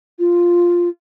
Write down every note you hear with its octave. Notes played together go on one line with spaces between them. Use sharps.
F4